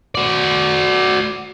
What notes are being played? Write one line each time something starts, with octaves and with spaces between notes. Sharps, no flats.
F#4 D5